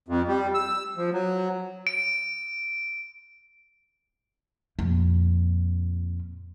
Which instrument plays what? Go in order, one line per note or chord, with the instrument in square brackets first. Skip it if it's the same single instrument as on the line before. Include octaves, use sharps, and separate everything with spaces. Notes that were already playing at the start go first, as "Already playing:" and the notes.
[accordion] F2
G3
E6
F3
F#3
[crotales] D7
[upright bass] F2 A#2